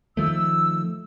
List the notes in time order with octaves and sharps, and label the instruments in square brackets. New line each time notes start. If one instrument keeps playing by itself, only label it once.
[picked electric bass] D#3 F3 A3 [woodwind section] E6